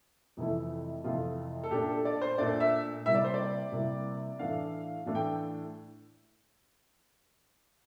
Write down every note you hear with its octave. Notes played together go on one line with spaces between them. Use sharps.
F2 C3 E3 A3 E4
F2 C3 E3 A3 E4 F4
A4
A#2 A3 D4 G4
A4
D5
C5
A#2 A3 D4 D5
E5
C3 G3 A#3 E4 E5
D5
C5
D5
C3 G3 A#3 E4
A2 E3 A3 D4 F5
A2 E3 A3 D4
G5